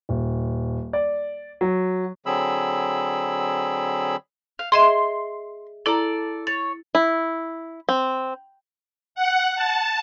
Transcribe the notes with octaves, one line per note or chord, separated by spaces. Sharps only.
D#1
D5
F#3
D3 F#3 C4 G#4 B5 E6
F5
G#4 D#5 E5 C6
E4 A4 D5 A#5
C#5 A6
E4
C4
F#5
A5